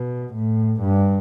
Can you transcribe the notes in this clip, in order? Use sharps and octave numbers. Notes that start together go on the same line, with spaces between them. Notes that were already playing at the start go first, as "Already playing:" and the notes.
Already playing: B2
A2
G2